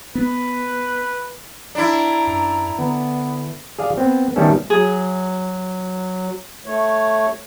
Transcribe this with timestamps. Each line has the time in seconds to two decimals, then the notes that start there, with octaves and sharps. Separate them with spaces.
0.15 B3 B4
1.75 D4 E4 A#5
2.27 F#2
2.79 D3 B3
3.79 G#4 D5 F5
3.98 B3 C4
4.36 D#3 G3 A3 B3 C#4 A4
4.70 F#3 G#4
6.66 A3 C#5